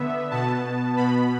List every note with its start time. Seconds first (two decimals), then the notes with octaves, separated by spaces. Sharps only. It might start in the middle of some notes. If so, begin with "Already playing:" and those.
Already playing: D3 B3 E5
0.31 B2 B3 A5
0.97 B2 B3 B5